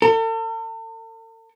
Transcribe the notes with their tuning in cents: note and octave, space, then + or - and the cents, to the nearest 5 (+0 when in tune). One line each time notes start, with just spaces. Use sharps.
A4 +45